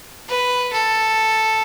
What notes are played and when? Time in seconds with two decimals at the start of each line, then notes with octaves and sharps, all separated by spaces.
0.29 B4
0.73 A4